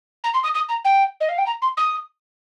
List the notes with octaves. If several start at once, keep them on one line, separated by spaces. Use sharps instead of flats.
A#5
C6
D#6
D#6
A#5
G5
D#5
F5
G5
A#5
C6
D#6